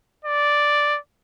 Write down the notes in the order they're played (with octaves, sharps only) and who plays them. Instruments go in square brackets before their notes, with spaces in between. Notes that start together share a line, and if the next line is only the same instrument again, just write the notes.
[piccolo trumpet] D5